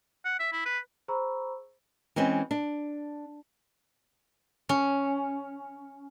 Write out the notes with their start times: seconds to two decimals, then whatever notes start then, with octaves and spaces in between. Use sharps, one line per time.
0.25 F#5
0.40 E5
0.53 E4
0.66 B4
1.08 G#4 C5 A#5 B5 C#6 E6
2.16 E3 G#3 C4 C#4
2.51 D4
4.69 C#4